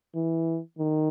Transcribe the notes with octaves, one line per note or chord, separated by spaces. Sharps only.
E3
D#3